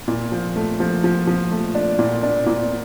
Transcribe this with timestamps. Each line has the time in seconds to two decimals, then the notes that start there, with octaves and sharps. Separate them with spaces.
0.08 A#2
0.32 F3
0.56 A3
0.80 F3
1.04 F3
1.27 F3
1.51 A3
1.75 D4
1.99 A#2
2.23 D4
2.46 A#2